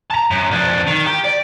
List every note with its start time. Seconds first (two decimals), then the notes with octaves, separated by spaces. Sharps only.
0.10 A5 A#5
0.31 F#2
0.51 F2 D4
0.87 D#3
1.06 G4
1.24 D5